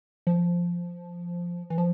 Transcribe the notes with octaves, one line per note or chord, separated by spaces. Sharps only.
F3
E3
F3